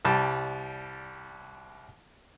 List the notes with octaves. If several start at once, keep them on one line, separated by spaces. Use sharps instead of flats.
C2 G3 A5